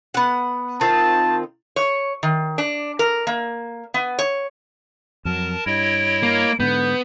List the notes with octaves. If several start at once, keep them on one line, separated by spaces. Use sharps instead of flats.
B3 F#5
D#3 C4 F4 A5
C#5
D#3
D4
A#4
A#3
B3
C#5
F2 F#3 A#4 A5
G2 E4 C#5 D#5 D7
A#3
G#2 D3 B3 G6